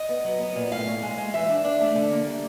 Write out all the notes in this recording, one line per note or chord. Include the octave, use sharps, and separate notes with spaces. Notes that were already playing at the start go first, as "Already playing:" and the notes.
Already playing: D#5
B3
F#3
B3
A#2
A2 F5
A2
G#3
G#3
E3 E5
D4
D4
A3
D3
A#3
G3